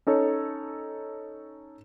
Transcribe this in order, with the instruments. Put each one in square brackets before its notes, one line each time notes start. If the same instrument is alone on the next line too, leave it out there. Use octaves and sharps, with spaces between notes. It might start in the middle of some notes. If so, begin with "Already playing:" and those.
[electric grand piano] C#4 D#4 A4 C#5